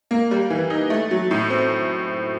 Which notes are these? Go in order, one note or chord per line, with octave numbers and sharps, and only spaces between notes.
A#3
G3
E3
D#4
A3
F#3
A2
C4